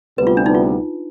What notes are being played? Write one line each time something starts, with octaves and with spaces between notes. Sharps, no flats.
D2 C3 G3 B3 B4
F4
D4
D#4
F4